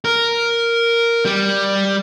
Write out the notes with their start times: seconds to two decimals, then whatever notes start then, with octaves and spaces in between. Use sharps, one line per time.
0.05 A#4
1.25 G3